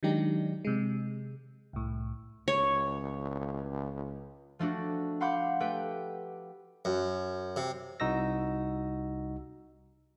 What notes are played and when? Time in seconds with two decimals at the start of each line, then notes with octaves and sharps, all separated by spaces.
0.03 D#3 F#3 G#3 D4 D#4 G4
0.65 C3 G#3
1.73 C2 A2
2.48 C#2 C#5
4.59 F3 A3 D4 F#4
5.20 F5 F#5 B5 C6 D6 G6
5.60 A3 G4 B4 G5
6.85 F#2
7.56 C3
8.00 C2 D#4 F#4 E6 A#6